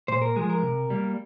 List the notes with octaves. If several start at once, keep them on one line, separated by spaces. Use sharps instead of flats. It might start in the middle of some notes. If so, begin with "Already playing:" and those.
A#2 C5
A#4
F3 G#3 G#4
A#4
C3
G3 A#3